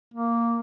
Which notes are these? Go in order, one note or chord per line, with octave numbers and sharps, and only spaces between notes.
A#3